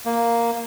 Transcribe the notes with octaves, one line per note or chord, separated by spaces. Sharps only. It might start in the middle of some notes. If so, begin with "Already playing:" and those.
A#3